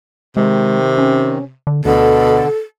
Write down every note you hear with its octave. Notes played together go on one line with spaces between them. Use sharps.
C3 D#3 G#3
C#4
D3
D2 B2 D3 A4